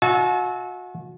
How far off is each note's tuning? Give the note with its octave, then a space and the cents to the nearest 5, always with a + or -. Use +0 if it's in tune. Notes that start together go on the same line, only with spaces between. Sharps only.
F#4 -30 E5 -15 A5 -45